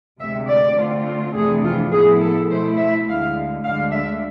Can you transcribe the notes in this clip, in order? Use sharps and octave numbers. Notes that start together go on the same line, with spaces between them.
D2 C3 G#3 E5
D5
D3 A3 C4 F4
F2 C3 E3 A3 D4 G#4
F4
A2 F3 B3 E4 G#4
A4
B2 A3 E4 C5
E5
D2 D3 G#3 F5
D2 D3 G#3 D4 F5
E5